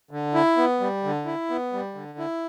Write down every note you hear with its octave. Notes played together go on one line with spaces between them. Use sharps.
D3
E4
B3
G3
D3
E4
B3
G3
D3
E4